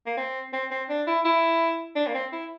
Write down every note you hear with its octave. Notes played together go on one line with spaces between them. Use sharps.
A#3
C4
C4
C4
D4
E4
E4
D4
A#3
C4
E4